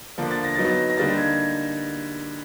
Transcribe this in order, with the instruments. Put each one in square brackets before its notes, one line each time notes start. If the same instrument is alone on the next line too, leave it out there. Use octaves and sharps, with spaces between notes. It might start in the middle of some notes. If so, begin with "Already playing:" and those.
[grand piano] D3 F3 A#3 D4
A6
A#6
F#3 B3 D#4 A6
A#6
A#6
D3 G3 A#3 D#4 A6
G#6